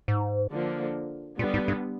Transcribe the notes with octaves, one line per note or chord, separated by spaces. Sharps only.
G#2
D3 F3 A#3
A#2 D3 G3 B3
G#2
G2